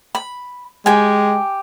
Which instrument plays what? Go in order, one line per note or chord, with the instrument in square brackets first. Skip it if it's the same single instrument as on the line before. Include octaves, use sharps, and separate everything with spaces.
[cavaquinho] B5
[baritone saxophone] G#3 [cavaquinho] G4 G#5